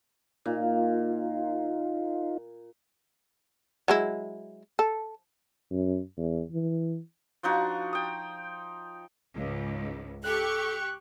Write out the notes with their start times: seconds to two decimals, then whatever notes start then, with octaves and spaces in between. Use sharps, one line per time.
0.46 A#2 D#4 F4
3.88 F#3 G#3 E4
4.79 A4
5.71 F#2
6.17 E2
6.52 E3
7.43 F3 D4 D#4 F#4
7.93 G5 D#6
9.35 C#2 G#2
10.24 G4 A4 C#6 F#6